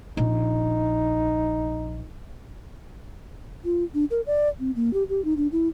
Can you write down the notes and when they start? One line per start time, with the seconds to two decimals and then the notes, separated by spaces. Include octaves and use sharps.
0.17 A#1 D#4
3.65 F4
3.94 D4
4.11 A#4
4.27 D5
4.60 C4
4.76 A#3
4.94 G4
5.09 G4
5.25 D#4
5.37 D4
5.52 E4